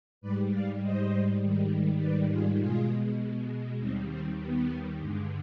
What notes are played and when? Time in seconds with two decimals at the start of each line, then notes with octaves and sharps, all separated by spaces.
0.21 G#2 G3 B4 D5
0.52 D5 F5
0.82 C5 D#5
1.41 G#2 D#3 G3
2.00 B4 D5
2.31 F4 G#4
2.60 B2 G#3 F4 G#4
3.79 D#2 D#3 G3 C4
4.10 C4
4.39 B3
4.98 G2 D3 G#3